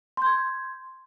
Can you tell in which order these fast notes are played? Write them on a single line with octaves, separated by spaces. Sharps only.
C6 G6 G#6